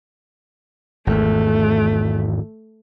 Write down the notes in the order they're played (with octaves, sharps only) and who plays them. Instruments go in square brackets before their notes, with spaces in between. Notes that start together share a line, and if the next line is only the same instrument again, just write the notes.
[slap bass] G#1 E2 [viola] A3